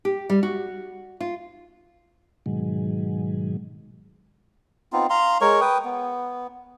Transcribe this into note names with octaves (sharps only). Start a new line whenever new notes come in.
G4
G3
F#4
F4
G#2 B2 D#3 F#3 G#3
B3 C4 D#4 F4
F5 A#5 C6
G#3 A#4 C#5 C#6
B4 G5 D#6
B3